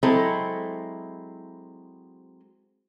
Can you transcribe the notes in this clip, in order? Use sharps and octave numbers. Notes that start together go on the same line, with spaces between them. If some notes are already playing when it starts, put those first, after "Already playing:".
F#3 G#3 C4 E4 A4